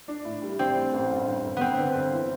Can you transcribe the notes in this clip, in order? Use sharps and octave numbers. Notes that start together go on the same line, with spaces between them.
D4
A2
G3
C4 D4
A2
A1
G1
G1
G1
G1 B3 C4
D3
G1
E3